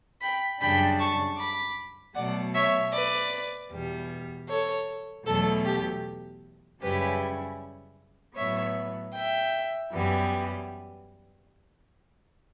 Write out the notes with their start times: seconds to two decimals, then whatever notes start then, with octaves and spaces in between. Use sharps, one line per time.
0.21 G5 B5
0.59 F#2 C#3 G3 D4 G5 B5
0.98 A5 C#6
1.37 B5 D6
2.15 B2 F#3 A3 D5 F#5
2.54 C#5 E5
2.92 B4 D5
3.71 E2 B2 G3
4.48 A4 C#5
5.25 E2 B2 F#3 A3 A4
5.65 G4
6.81 F#2 C#3 G3 C#4 E4 G4 B4
8.36 A2 F#3 B3 C#5 E5
9.14 E5 G5
9.92 F#2 E3 G3 B3